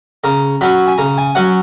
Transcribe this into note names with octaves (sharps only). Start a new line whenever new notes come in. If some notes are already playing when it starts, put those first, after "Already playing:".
C#3 A#5
F#3 C#4 B5
G#5
C#3 A#5
G#5
F#3 C#4 F#5